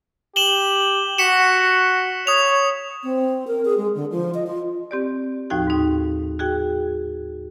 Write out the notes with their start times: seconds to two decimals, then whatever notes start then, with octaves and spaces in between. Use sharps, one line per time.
0.36 G4 E7 F#7 G7
1.18 F#4 B6 C#7 E7
2.27 C#5 D#6 F7
3.04 C4
3.47 A#4
3.65 G#4
3.77 G#3
3.95 D3
4.11 F3
4.34 D#5
4.47 F4
4.91 C4 G4 D5
5.50 D#2 A2 F3 D#4 F#4 G5
5.67 G#2 D#4
6.39 F#4 G#4 G5